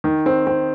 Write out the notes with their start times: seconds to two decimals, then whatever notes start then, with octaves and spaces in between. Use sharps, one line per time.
0.04 D#3
0.26 C4
0.47 C4